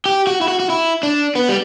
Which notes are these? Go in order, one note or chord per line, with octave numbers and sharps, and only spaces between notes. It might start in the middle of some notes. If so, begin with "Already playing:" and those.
G4
F#4
E4
F#4
F#4
E4
D4
B3
G3